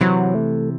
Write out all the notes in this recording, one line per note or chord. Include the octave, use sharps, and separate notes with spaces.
C3 E3 F#3
A3